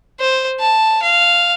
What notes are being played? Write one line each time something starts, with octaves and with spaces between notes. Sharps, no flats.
C5
A5
F5